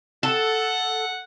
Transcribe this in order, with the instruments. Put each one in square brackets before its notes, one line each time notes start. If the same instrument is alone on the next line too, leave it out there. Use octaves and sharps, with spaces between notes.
[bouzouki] A4 [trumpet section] F#5